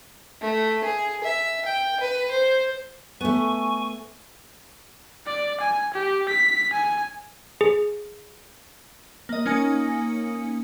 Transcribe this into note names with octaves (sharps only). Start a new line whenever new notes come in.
A3
G#4
E5
G5
B4
C5
A3 B3 G#5 C#6
D5
G#5
G4
B6
G#5
G#4
A#3 D#5
A#3 C#4 D#4 G#5 D#6 C#7